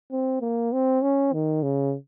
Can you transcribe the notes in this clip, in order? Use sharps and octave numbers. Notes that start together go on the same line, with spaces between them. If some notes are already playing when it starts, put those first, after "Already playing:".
C4
A#3
C4
C#4
D#3
C#3